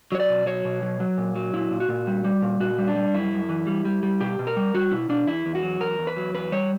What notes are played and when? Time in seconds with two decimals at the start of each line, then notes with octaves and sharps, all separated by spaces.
0.12 F#3 C#5
0.20 D5
0.29 B2
0.46 F#3 C#5
0.65 B2
0.82 F#3
1.00 F#3
1.18 A#2
1.36 F#3
1.54 A#2 E4
1.71 A#2
1.80 F#4
1.89 A#2
2.07 G3
2.25 G3
2.42 A#2
2.60 A#2 F#4
2.78 G3
2.88 D4
2.96 G3
3.14 F#2 E4
3.32 F#2
3.49 E3
3.67 G3
3.85 G3
4.03 G3
4.20 B2 G4
4.39 B2
4.47 A#4
4.57 G3
4.75 G3 F#4
4.92 B2 E4
5.09 B2 D4
5.27 E2 E4
5.46 E2
5.55 F#4
5.63 F#3
5.80 E2 A#4
5.99 E2
6.07 B4
6.17 F#3
6.34 E2 B4
6.52 G3 C#5